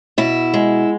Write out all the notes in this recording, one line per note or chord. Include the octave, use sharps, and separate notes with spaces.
B2 E4
G#3